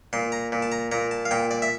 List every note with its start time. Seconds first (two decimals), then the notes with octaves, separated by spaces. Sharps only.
0.13 A#2 C6
0.32 A#5
0.52 A#2
0.62 A5
0.72 A#5
0.91 A#2 A#5
1.11 A5
1.25 F5
1.31 A#2 G5
1.51 D5
1.62 E5